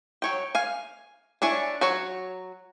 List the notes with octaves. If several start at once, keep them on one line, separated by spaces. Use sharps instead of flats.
F#3 C#5 G5
F5 G#5
D4 E4 C#5 G#5
F#3 F#4 C#5